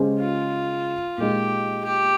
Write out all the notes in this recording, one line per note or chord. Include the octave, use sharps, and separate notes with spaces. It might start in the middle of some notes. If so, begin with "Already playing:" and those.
Already playing: C#3 G#3 C#4 G4 C5
F4
A#2 G#3 D#4 G4
G4